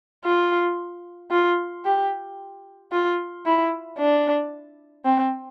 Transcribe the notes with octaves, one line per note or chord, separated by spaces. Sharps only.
F4
F4
G4
F4
E4
D4
C4